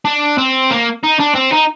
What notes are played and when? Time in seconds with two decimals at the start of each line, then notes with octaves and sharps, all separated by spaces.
0.05 D4
0.38 C4
0.71 A#3
1.04 D#4
1.20 D4
1.36 C4
1.53 D#4